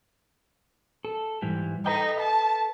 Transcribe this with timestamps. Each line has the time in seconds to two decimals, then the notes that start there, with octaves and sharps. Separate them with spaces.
1.05 A4
1.42 G#2 E3 G3
1.86 D#4 A4 B4 G5
2.21 A5